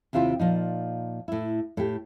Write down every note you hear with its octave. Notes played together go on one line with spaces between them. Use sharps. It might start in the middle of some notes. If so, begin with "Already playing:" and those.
D#2 C3 E4 F4 G5
A#2 F3 D#4
A2 E4
A2 G4